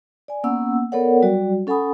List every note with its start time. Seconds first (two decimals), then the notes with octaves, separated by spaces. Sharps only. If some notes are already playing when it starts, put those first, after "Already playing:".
0.28 D5 G#5
0.44 A#3 B3 C#4 F#5 E6
0.92 B3 A4 A#4 C#5 D5 F#5
1.22 F#3 G3 F#4 D5
1.67 C#4 A4 F#5 G#5 B5 D#6